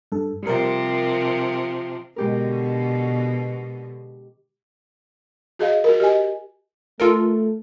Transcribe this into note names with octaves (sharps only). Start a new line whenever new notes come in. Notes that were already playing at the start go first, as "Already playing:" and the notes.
G2 A4
C3 F3 G3 A#4
B2 D3 G#3 G4 A#4
F#4 G#4 D#5 F5
F#4 A#4
G4 D#5 G#5
A3 F4 A4 A#4